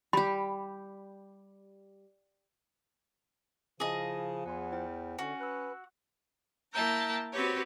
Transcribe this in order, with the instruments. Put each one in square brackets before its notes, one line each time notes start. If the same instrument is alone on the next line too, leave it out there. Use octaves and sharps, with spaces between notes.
[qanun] G3 G4 [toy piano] B5
[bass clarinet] C#3 [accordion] F3 [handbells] E4 A5 [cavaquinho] G#4 D#5
[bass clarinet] E2 [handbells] F#5 G#5 C6
[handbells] E4 C5 G5
[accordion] D3 [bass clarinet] C#4 [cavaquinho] F#4
[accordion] B4 [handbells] E6 F#6
[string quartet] A#3 E4 G5 A5 A#5
C4 F#4 G4 B4 C#5